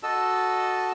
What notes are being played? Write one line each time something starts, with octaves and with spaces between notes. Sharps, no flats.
F#4 A4 D#5 A5 E6